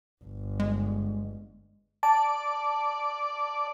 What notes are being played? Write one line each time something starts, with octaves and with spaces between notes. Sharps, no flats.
G1
G#3
D5 A5